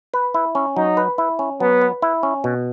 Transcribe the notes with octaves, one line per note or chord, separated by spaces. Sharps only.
B4
E4
C#4
F#3 D#4
B4
E4
C#4
F#3 B3
B4
E4
C#4
B2